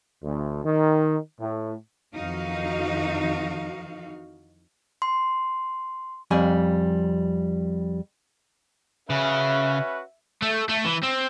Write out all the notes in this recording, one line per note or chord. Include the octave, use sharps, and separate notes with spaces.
D2
D#3
A2
F2 D#3 E3 D#4 F#4 F5
C6
F2 G3 G#5
C#3 C#4 F#4 B4 E5
A3
A3
E3
C4